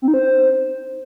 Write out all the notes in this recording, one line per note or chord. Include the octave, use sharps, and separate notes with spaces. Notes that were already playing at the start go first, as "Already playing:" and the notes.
C4
D#4
C5